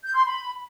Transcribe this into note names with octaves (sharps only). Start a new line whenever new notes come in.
G6
C6
B5